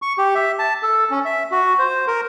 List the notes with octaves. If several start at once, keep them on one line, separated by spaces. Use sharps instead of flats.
C#6
G4
E5
A5
A4
C#4
E5
F#4
C5
A#4